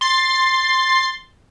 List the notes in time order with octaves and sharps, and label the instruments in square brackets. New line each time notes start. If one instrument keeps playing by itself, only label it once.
[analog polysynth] C6 A6 C7